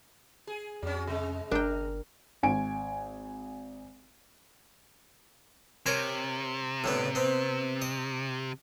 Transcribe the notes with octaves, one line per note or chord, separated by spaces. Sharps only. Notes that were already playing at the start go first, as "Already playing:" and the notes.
G#4
F2 F#3 C#4
C3 G#3
G1 D4 A#4 G5
G#1 G#5 D7
C3 A#4 C#5 G#5
A2 D3 B3
B3 C4
D#5